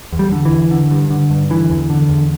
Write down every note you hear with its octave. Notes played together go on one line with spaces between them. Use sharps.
E2
G3
D3
E3
E2
D3
G2
D3
G2
D3 E3
E2
D3
E2